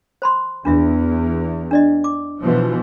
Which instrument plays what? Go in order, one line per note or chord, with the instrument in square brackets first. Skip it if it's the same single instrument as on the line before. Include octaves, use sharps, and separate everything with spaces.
[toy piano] C5 B5 C6
[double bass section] E2 [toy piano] D4 F4 E5
[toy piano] D4 D5 D#5
D6
[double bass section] B2 E3 F3